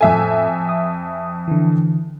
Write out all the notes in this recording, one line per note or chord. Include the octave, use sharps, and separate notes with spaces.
F2 A2 A4 E5 G#5
D#6
D3 E3